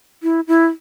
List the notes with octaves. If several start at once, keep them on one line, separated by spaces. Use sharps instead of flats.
E4
E4